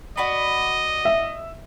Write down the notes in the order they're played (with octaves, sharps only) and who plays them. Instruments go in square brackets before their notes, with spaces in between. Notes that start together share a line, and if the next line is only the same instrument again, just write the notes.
[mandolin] F#4 D5 B5 [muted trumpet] D#5
[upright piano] E5